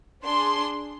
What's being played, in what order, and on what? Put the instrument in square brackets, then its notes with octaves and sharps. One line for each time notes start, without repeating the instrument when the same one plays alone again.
[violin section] D4 G#4 C6